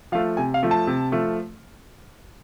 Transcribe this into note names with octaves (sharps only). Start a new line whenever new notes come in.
F3 A3 F5
C3 G#5
F5
F3 A3
A5
C3
F3 A3